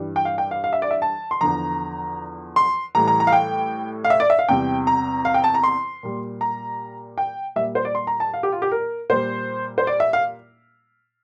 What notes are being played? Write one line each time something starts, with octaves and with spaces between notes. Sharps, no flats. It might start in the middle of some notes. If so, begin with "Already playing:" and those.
Already playing: G2 E3 G3
G5
F5
G5
F5
F5
E5
D5
E5
A5
C6
E2 D3 F3 A#5
C6
A2 E3 G3 A#5
A#5
A#5
F5
G5
F5
E5
D5
E5
F5
E2 C3 G3 G5
A#5
F5
G5
A5
A#5
C6
A#2 G3
A#5
G5
A#2 G3 E5
C5
D5
C6
A#5
A5
F5
G4
F4
G4
A#4
A#2 G3 C5
C5
D5
E5
F5